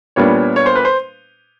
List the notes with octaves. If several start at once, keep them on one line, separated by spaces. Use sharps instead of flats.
A#2 G3 B3 D4 C#5
C#5
C5
B4
C5